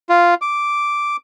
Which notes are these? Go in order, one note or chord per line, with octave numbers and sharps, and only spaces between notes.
F4
D6